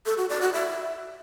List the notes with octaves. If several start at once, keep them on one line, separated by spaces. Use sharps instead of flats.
A4
F#4
D5
F#4
E5